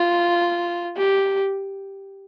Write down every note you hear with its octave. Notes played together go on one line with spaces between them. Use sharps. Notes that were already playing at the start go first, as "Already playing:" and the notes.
Already playing: F4
G4